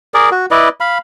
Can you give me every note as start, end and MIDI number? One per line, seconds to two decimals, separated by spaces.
0.14 0.30 68
0.14 0.30 70
0.14 0.30 74
0.31 0.46 66
0.51 0.69 64
0.51 0.69 71
0.51 0.69 74
0.51 0.69 75
0.80 0.98 77
0.80 0.98 83